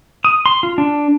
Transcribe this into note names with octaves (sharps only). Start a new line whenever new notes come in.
D#6
C6
F4
D4